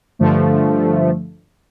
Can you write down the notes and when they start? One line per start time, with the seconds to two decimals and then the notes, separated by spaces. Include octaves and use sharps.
0.19 G2 D3 F3 A3